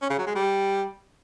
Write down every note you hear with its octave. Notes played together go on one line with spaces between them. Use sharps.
C#4
C#3
F#3
G#3
G3